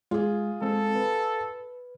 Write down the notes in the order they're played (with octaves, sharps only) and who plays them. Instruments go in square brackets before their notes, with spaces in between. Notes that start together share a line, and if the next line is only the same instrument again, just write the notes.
[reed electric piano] G#3 [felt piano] F4 G#4
[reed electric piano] G#3 C4 [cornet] A4
[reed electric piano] B4